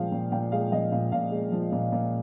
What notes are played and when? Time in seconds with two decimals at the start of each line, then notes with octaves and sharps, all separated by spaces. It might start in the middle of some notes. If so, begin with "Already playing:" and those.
Already playing: A#2 F3 G#3 F5 G5
0.12 A#2
0.32 A#2 G5
0.52 G#3 F5
0.72 F3 D#5
0.92 A#2 F5
1.12 A#2 F5
1.31 G#3
1.52 F3
1.72 A#2
1.92 A#2